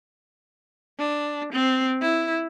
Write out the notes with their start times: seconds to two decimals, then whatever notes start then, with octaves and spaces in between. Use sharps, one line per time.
0.99 D4
1.52 C4
2.01 E4